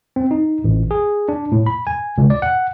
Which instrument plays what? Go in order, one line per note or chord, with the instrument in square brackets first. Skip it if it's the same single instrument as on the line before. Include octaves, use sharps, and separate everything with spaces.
[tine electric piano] C4
D#4
A1
G#4
D4
A2
B5
G#5
C#2
D5
F#5